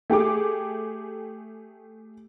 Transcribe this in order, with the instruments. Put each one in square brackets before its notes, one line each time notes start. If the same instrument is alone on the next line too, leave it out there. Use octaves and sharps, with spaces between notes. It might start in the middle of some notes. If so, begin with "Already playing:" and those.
[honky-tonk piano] A3 G4 G#4 D6